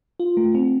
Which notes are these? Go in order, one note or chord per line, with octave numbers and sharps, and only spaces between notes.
F4
A3
C4